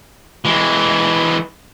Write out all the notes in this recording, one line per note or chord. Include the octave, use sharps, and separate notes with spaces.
E3 G#3